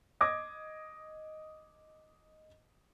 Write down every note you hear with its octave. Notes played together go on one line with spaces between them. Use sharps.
D#5 D6 D#6 G#6 A#6